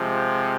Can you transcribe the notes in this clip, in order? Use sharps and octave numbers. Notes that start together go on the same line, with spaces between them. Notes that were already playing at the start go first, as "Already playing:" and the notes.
Already playing: C3 F3 G#3